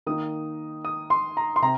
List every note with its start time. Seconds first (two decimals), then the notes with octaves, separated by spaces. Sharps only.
0.07 D#3 A#3 D#4 D#6
0.85 D#6
1.10 C6
1.37 A#5
1.56 C6
1.62 C3 A#5